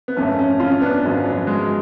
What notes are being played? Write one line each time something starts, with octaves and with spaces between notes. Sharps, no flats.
B3
G#1 F#2 F3 A3 C#4
A3 C#4
C#4 F4
B3 D4
G#1 F#2 F3 F#3
F#3
G#3